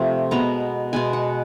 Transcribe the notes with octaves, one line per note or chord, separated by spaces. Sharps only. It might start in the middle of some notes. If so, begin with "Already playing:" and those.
Already playing: C3 F3 A3
B2 G#3 B3 A#5
B2 G#3 B3 G#5
F#5